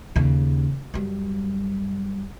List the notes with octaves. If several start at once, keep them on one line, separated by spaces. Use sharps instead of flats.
D#2 C#3
F#2 G3